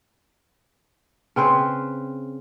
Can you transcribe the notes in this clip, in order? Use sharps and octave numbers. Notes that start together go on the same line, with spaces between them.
C#3 C4 B4 C5